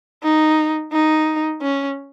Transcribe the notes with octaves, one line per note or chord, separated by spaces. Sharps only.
D#4
D#4
C#4